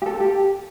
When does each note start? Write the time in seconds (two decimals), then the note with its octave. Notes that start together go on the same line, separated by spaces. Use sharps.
0.02 G4
0.06 A4
0.20 G4